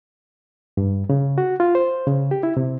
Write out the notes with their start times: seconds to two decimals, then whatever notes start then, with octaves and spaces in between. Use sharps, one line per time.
0.77 G2
1.10 C#3
1.38 F#4
1.60 F4
1.75 C5
2.07 C#3
2.31 G4
2.43 E4
2.57 C3